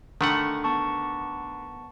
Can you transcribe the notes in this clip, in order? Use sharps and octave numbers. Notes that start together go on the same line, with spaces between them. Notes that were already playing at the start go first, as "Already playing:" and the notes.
D3 D#3 A3 F#5
B3 A5 C#6